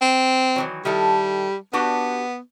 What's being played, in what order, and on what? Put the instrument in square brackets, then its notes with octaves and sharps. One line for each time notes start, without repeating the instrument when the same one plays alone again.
[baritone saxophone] C4
[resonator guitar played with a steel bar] D#3 E3 F#3
[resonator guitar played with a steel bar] D#3 E4 A4 [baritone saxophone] G3
[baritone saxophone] B3 [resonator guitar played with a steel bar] D4 F#4 G4